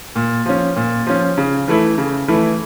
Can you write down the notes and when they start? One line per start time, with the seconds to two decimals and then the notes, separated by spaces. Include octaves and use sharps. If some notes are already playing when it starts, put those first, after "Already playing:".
0.16 A#2
0.46 F3 C#4
0.76 A#2
1.07 F3 C#4
1.38 C#3
1.68 E3 A3 E4
1.98 C#3
2.28 E3 A3 E4